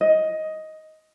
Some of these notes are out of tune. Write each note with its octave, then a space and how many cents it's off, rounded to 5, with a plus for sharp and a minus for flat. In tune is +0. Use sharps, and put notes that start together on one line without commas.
D#5 +10